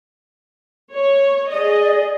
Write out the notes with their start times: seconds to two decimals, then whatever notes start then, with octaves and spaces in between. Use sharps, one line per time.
0.94 C#5
1.52 G#4 D5 D#5